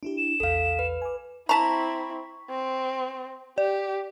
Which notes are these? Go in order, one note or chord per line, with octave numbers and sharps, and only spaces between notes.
D4 E4 G4
E7
A#1 E2 A4 F5
B4
G#5 D6
C4 E4 A5 A#5 C#6 B6
C4
G4 D5